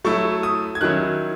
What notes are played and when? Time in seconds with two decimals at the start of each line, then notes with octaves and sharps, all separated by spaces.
0.05 F#3 A3 E4 C#6
0.43 D#6
0.75 G#6
0.81 D#3 F#3 C#4 E4 F#6